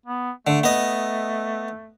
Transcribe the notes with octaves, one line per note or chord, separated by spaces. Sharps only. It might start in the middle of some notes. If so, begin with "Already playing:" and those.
B3
D3 A3
B3 D#5